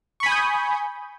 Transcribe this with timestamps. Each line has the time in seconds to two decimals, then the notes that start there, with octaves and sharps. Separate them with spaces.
0.20 C#6
0.23 B5
0.26 G#5
0.29 D#6
0.32 G6